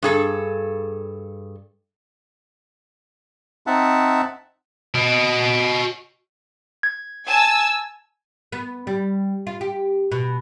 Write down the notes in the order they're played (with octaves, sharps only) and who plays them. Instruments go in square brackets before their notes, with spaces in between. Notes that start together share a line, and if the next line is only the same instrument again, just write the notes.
[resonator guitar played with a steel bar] G2 G#4 A4
[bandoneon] C4 D#4 E5 F#5 A5
[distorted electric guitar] F#4 D#5
[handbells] G#6
[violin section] G#5 A5 E6
[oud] B3
G3
F4
G4
B2